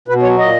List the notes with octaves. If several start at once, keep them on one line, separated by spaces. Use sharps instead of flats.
B2 B4
F#3 C#5
A#2 D#5